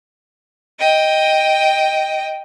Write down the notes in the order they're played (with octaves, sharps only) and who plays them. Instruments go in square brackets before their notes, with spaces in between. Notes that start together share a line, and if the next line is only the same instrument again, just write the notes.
[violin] D#5 G5